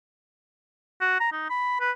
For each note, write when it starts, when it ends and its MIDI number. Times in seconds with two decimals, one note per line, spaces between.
1.01 1.18 66
1.20 1.31 82
1.32 1.49 63
1.50 1.76 83
1.80 1.91 71